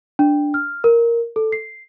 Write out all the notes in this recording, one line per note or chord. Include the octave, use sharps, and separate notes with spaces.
D4
F6
A#4
A4
C7